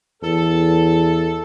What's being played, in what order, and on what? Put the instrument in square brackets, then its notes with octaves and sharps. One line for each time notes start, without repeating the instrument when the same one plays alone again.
[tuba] E2 [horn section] A4